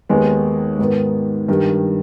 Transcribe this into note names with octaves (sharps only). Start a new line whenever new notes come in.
D#2 D#3 G#3 B3
G#2 D#3 B3
G2 D#3 G3